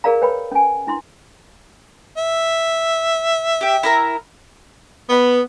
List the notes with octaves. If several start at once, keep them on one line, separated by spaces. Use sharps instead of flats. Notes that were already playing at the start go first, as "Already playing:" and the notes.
G#4 A#4 D5 F5 A#5
B4 C#5 G5 B5
C#4 G#5
D4 E4 C6
E5
G4 G5
E4 A#4 A#5
B3